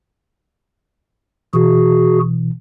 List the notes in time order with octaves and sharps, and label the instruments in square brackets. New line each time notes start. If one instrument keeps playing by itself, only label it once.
[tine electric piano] B2 E3 [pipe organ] F#4 G#4